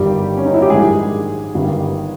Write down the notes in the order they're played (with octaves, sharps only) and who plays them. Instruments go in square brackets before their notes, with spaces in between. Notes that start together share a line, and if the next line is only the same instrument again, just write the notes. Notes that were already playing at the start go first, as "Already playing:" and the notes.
Already playing: [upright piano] G1 G2 D#3 G3 G4
C#4
D#4
E4
G4
A#1 G#2 D#3 G3 G#3 G#4
G1 G2 D#3 G3